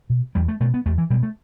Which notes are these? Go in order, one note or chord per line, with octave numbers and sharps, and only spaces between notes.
B2
E2 G3
A3
B2 A3
B3
E2 A3
E3
B2 G3
A3